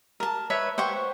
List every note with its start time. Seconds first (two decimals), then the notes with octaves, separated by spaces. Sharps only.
0.20 A#4 A5
0.50 B4 C#5 E5
0.78 C5 F#5 G5 C#6